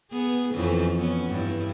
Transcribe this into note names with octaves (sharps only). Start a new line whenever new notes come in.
B3 G#4
F2 E3 C#4
B3 C#4
G2 E4